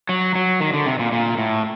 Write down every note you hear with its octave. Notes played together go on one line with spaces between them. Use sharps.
F#3
F#3
D#3
D3
C3
A#2
A#2
A2